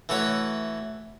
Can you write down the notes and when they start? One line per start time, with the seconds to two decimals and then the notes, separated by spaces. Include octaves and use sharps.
0.09 E3 A3 F#4 C#5